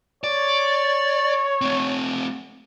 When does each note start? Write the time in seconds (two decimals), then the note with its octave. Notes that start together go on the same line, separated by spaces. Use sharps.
0.24 C#5 D5
1.61 A3 C4